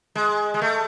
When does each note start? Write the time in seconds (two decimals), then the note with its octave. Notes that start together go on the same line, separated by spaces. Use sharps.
0.15 G#3
0.54 G#3
0.61 A3